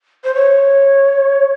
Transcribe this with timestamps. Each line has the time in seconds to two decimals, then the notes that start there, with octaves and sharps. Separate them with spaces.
0.24 C5
0.35 C#5